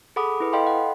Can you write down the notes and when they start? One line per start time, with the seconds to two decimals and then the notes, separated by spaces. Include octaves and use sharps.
0.16 G#4 A4 F#5 B5 D6 D#6
0.40 E4 B4
0.53 A4 D#5 F5 G5 B5 C6
0.67 F#5